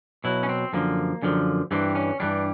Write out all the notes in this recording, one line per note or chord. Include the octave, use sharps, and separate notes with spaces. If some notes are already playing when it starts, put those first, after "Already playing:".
B2 F#3 E4
C#4
C4
F#2 D3 F3 A#3
F#2 D3 F3
G2 E3 G3 C4
C#4
G2 E3 G3 D4